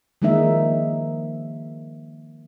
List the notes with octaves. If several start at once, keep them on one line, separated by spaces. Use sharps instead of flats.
D#3 F3 G#3 A#3 D#4 E5